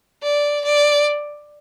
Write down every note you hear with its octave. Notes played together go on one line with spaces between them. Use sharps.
D5
D5